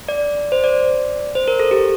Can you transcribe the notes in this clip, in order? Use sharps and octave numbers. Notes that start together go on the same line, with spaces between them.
D5
C5
D5
C5
A#4
A4
G4